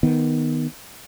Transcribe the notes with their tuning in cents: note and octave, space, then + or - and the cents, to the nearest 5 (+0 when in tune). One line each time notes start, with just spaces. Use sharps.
D#3 +0 B3 +0